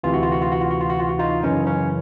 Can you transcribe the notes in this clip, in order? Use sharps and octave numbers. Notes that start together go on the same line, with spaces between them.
D2 C3 E3 F4
F#4
F4
F#4
F4
F#4
F4
F#4
F4
F#4
F4
F#4
D#4 F4
F#2 C#3 E3 C#4 D#4
C#4